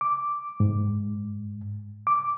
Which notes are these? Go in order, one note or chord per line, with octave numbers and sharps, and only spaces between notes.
D6
G#2
D6